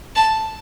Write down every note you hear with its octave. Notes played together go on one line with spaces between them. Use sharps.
A5